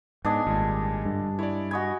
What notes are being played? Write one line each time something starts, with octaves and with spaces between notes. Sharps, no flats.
G#2 G#3 B3 D4 D#5 G#5
G#1 A#2 G3 G#3
G2 D3
E4 C#5 D5
F#4 D#5 G#5 B5 C#6